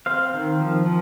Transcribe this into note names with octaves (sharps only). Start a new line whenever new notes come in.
C4 C5 F5
D#3
F3
F3